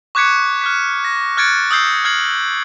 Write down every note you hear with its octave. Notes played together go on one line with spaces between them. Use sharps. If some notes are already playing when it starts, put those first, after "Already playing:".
C#6 D6 F#6 G#6 B6 C#7
F6 F#6 B6
A#6
F6 F#6 G#6 A6 C#7 D7
D#6 E6 G6 C7
F6 G#6 C7 F#7